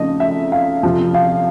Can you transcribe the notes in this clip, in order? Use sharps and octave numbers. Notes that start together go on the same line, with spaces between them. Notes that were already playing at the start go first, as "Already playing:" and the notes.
Already playing: C#3 F3 A3 C4 D#4 D#5
E5
F5
F2 C3 F3
F5